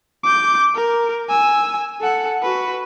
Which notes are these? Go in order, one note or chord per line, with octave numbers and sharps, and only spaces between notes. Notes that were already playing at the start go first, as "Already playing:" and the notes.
D6 G6
A#4
G#5 E6
A4 F#5
F#4 B4